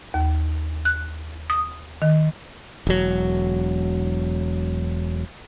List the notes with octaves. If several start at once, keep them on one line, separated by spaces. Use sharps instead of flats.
D#2
F#6
D#6
D#3
E1 F#3